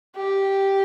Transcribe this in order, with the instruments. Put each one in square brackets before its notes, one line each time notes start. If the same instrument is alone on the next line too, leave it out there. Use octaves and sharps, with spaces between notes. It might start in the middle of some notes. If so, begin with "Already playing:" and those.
[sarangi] G4